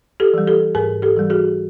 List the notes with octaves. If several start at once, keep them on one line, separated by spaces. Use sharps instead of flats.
G4 A4
E3 G3
G4 A4
G#2 G#4 A#4
G4 A4
E3 G3
F#4 G#4